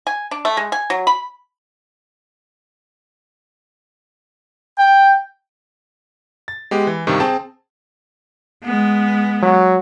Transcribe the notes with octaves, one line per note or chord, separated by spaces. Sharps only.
G#5
D4
A3
G#3
G#5
F#3
B5
G5
A6
G#3 B3 G4
E3
G2 C3 D#3
C4 G#4 G5 A5
G#3 B3
F#3